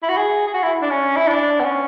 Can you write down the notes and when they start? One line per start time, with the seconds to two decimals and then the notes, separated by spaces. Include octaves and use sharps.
0.03 E4
0.09 F#4
0.17 G#4
0.47 G#4
0.54 F#4
0.63 E4
0.82 D4
0.90 C#4
1.16 E4
1.27 D4
1.60 B3
1.65 C#4